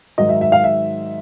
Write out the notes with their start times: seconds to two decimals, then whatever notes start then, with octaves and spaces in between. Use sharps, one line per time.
0.18 G#2 D#3 F#3 D#5
0.29 E5
0.41 E5
0.52 F5
0.64 E5